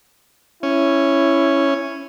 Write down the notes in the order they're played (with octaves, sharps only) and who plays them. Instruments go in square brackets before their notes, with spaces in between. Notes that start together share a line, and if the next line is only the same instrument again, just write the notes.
[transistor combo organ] C#4 [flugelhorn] E4